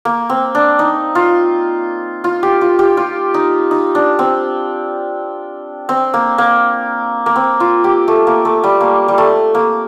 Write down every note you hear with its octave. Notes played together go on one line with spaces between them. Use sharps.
A#3
C4
D4
D#4
F4
F4
G4
F4
G4
F4
D#4
D#4
D4
C4
C4
A#3
A#3
A#3
C4
F4
G4
A3
A#3
A3
G3
A#3
G3
A3
A#3